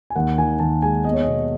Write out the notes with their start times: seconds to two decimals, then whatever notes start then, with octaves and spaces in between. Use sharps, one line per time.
0.10 G#5
0.16 D#2 F#5
0.38 D#3 G#5
0.60 D#2 A5
0.82 G#3 G#5
1.05 B3 D#5
1.13 C#5
1.21 D#5
1.27 B2